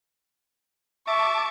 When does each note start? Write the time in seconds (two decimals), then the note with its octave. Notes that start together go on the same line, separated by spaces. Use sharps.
1.07 E5 A5 C#6 D6